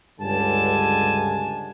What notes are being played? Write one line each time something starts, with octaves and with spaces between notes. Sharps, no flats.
C#2 G2 D3 G#5 A5